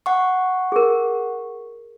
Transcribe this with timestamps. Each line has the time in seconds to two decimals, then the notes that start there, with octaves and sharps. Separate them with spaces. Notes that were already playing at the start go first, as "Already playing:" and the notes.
0.06 F#5 C#6
0.72 G#4 A#4